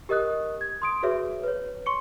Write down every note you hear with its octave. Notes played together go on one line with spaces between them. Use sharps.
G4 A#4 D#5 D#6 F#6
G#6
C6 D#6 D7
F#4 G#4 B4 C#5 E5
B4 C#5
C6 C#6 C#7